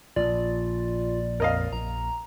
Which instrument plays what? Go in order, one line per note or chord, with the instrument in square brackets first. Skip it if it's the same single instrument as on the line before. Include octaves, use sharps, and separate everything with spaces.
[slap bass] A#1 [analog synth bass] F4 [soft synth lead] D5
[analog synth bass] F2 [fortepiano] A#4 D#5 F5
[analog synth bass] A#1 [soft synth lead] A#5